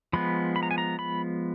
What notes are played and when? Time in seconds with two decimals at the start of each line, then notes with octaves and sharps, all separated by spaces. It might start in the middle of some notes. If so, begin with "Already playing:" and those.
0.13 F3 G#3 B3 B5
0.56 B5
0.63 A#5
0.71 G#5
0.78 A#5
0.99 B5